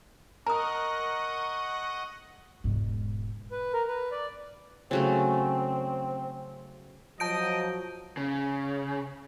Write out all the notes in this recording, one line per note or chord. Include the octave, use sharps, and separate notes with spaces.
A#4 D#5 F#5 A#5 C#6 D#6
E1 G#2
B4
A#4
B4
D5
C#3 F#3 A3 C4
F3 F#3 D#5 A5 G6 D7
C#3